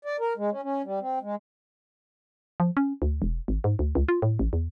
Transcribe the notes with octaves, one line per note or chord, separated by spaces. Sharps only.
D5
A#4
G#3
C#4
C#4
G3
C4
G#3
F3
C#4
D2
E1
G#1
G#2
D2
C#2
F4
A2
A1
E2